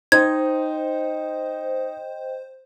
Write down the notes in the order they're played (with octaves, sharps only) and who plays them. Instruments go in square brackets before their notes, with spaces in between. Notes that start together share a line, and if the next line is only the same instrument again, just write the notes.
[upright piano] D#4 [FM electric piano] C5 [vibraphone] D#5 G5 [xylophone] G#6